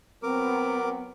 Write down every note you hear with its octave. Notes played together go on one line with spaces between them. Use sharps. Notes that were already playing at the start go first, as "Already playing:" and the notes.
F#3 B3 C4 A#4 D6